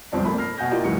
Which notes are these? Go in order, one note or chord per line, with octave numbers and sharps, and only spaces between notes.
G1 C2 F3 C4 D5 A5
A3 A#3 B5
F6 A#6 C7
B2 F#4 F#5 G#5 G6 A#6
A#3 E4 F4 G4 D5 D#5
C#2 G#2 E3 F#3 C#6 C#7